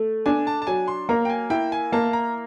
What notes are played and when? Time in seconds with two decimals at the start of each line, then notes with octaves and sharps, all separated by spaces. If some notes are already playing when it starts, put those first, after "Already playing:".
Already playing: A3
0.26 D4 G#5
0.47 A5
0.62 A5
0.67 F#3 G#5
0.88 C6
1.09 A#3 A#5
1.25 G5
1.30 G#5
1.50 E4 G5
1.72 G#5
1.92 A#3 A5
2.13 A#5